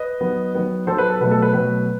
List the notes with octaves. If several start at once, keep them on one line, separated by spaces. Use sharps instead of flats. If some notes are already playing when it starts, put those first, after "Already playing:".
Already playing: B4 D#5
D#3 F#3 B3
D#3 F#3 B3
D#3 F#3 B3 A4 C5
B4
A4
B2 F#3 A3 B4
A4
B4
B2 F#3 A3 B4